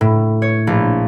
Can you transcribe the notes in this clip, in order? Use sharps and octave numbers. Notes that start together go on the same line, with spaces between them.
A2
C#5
A#1